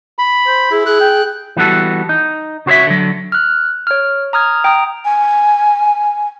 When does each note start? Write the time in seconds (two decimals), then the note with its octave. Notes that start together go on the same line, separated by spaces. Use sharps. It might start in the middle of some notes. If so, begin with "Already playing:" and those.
0.19 B5
0.47 C5
0.71 E4 G#4
0.86 G#4 F#6
1.00 G5
1.57 E3 G3 B3 F#4 A4
2.09 D#4
2.66 C#3 F#4 C5 C#5 E5
2.87 D3 F#3
3.32 F6 F#6
3.87 C#5 F6
4.33 A#5 D#6 F6 G#6
4.64 G5 A#5 D#6
5.05 G#5